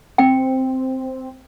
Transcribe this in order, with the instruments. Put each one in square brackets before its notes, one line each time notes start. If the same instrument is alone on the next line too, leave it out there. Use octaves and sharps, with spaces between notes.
[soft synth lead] C4 [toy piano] G5